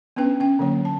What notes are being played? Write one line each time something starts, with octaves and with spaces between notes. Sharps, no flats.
B3 C#4 D4 B4 G5
C#4 G5
D3 F#3 A#3 C#5
A5